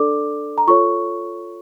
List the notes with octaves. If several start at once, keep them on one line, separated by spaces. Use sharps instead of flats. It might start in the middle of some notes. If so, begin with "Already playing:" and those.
Already playing: D4 A4 D5 D6
A#5
F4 A4 C#5 C#6